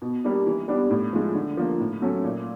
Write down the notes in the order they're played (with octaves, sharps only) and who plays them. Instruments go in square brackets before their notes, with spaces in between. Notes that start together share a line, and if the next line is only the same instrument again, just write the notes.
[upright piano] B2
G3 A#3 D4
E3
G3 B3 D4
A2
F3 G#3
D3
F3 A#3
A2
F#3 A3 C#4
A#2